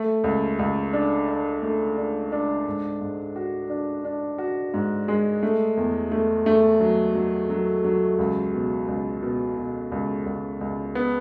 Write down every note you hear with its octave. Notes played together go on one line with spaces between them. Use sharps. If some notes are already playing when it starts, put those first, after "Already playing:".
Already playing: A3
C#2
C#2
D4
D4
A3
D4
D4
G#2
G#2
F#4
D4
D4
F#4
G#2
G#3
A3
E2
A3
A3
F#3
F#3
F#3
F#3
C#2
B2
C#2
B2
B2
C#2
C#2
C#2
B3